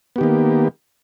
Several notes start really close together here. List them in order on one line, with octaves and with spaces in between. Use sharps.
B3 G4 D#3 A#3